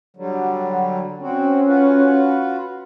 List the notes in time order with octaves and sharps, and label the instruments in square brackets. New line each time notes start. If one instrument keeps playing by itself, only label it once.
[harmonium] D3 F#3 G3
[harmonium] C4 F#4 [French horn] C#4
[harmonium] F4 F#4 B4